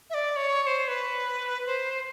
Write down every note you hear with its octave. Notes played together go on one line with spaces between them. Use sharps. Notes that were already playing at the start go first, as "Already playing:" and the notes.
E5
D5
C#5
C#5
C5
B4
C5